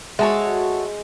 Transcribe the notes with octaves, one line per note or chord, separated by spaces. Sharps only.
G#3 F#4 A4 C#5 E5 F#5